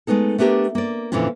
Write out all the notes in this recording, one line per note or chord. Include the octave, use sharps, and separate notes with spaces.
G#3 A3 B3 D#4 A4
A3 B3 D4 G4 A#4
A#3 D5
F2 A#2 D3 E3 C#4 F4